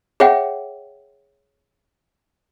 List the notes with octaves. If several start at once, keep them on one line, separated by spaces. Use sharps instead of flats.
G#4 C#5 E5 F#5 G5